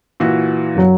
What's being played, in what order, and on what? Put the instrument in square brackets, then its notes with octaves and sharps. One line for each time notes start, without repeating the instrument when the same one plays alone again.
[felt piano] A#2 E3 F#4
[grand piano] F#2 F#3